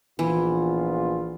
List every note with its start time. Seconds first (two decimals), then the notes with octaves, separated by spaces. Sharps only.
0.19 A#1 E3 B3 F4